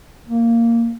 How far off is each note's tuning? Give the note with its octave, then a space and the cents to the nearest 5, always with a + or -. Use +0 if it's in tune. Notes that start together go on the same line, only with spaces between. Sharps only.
A#3 -10